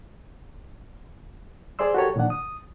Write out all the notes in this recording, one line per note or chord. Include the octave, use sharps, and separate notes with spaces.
G#4 C5 D5 C6 E6
F#4 G4 A4 A#4 C#5
A#2 D#3 F3 D4 F#5
D#6